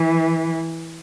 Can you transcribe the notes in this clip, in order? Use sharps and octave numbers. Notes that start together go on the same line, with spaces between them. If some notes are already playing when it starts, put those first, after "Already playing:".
Already playing: E3